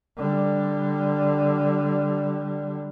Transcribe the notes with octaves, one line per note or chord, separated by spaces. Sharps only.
D3 G3